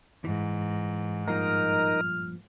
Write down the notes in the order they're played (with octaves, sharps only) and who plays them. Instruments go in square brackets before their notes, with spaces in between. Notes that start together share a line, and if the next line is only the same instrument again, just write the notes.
[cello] G#2 [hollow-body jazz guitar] E3
[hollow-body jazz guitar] G2 A#2 F3 [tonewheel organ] D#4 A#4 [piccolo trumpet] F6